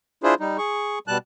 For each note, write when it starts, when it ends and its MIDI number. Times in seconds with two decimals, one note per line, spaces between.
0.24 0.34 62
0.24 0.34 64
0.24 0.34 65
0.24 0.34 68
0.24 0.34 72
0.40 0.58 55
0.40 0.58 63
0.58 0.99 68
0.58 0.99 85
1.08 1.18 47
1.08 1.18 55
1.08 1.18 81
1.08 1.18 90